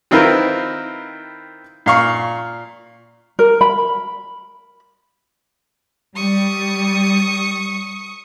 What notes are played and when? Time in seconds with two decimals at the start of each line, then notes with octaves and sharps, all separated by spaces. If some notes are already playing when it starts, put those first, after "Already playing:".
0.11 D#3 C4 E4 F4 A#4 B4
1.86 A#2 F5 C#6
3.39 A#4
3.61 B5
6.16 G3 C#6 D#6